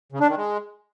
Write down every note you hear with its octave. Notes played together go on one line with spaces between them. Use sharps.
C#3
D4
D#3
G#3